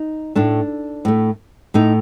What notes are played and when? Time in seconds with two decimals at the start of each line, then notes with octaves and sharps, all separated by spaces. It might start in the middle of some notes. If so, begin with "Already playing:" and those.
Already playing: D#4
0.35 A2 A3 D4
1.05 A2 A3
1.74 A2 A3 D#4